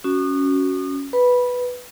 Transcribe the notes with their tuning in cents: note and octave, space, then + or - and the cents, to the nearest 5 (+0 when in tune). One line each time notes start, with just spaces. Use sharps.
C#4 +5 F#4 +0 D#6 -40
B4 +0 B5 -10